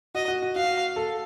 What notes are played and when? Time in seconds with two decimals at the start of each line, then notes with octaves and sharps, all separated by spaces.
0.15 F#4 D#5
0.28 F#4
0.42 F#4
0.56 F#4 F5
0.96 A4